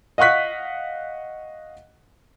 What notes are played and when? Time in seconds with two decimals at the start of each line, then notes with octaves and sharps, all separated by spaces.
0.18 D#5 F5 F#5 C#6 F#6 B6